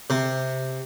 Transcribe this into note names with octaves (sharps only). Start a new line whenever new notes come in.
C3